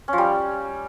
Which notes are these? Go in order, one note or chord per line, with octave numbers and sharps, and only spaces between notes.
C#4
F3
G3